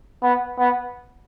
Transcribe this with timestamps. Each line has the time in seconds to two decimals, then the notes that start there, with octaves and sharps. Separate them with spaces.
0.23 B3
0.59 B3